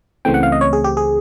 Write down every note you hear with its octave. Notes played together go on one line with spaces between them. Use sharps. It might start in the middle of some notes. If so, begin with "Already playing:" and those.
C#2 C#3 E3 A3 C4 G5
F#5
F5
D#5
C#5
G#4
G4
G#4